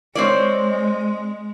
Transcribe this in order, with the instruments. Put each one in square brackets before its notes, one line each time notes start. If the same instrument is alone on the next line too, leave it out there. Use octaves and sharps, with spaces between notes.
[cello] G#3 [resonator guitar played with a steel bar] C4 C#5 D5